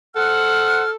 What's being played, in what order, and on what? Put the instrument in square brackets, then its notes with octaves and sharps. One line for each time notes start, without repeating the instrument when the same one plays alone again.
[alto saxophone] A4 [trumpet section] C5 F#5 [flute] F6